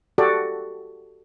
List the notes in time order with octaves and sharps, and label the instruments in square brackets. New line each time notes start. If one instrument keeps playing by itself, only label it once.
[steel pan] F#4 G4 A4 D5